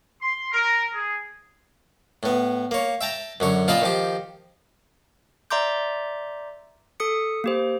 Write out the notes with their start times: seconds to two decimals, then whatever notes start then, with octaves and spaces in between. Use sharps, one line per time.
0.21 C6
0.52 A#4
0.93 G#4
2.23 A2 B3
2.71 A#3 C#5
3.01 E5 G5 A5 A#5
3.40 F#2 D3 C#5
3.68 A#2 F4 A#4 D#5 A5 B5
3.82 D#3 F3 G4
5.50 D5 E5 A#5 C6 D6 G6
7.00 A4 D#6 C#7
7.44 A#3 G4 C5